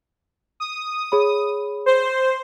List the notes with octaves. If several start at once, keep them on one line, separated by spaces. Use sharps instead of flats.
D#6
G#4 C#5 B5
C5